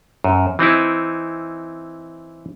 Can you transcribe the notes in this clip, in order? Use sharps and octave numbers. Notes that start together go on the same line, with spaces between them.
F#2
E3 C4 D#4 E4